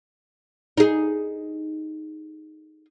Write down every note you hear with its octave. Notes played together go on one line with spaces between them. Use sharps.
D#4 G#4